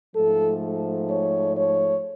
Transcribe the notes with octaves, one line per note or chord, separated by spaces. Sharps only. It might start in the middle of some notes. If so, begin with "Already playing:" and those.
G#2 F3 A3 A4
C#5
C#5